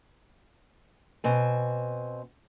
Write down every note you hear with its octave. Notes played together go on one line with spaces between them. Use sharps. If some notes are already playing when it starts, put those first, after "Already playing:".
B2 C4 G#5